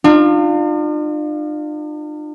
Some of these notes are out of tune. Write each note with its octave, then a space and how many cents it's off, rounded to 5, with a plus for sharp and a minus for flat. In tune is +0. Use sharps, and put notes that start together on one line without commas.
D4 +45 F4 +5